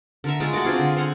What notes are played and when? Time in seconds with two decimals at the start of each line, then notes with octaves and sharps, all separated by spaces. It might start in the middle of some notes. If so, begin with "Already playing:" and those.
0.24 D3 A#4 E5
0.40 G#3 A3 F4
0.53 A3 F#4 A#4 D5
0.65 C4 D4 F4 G#4
0.79 D3
0.96 C5 F5 F#5 G#5